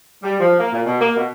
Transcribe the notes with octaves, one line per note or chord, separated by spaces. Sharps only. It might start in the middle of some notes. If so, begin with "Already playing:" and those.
G3
F3
A#3
A#2
B2
A#3
B2